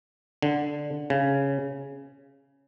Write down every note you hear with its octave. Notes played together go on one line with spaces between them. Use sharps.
D3
C#3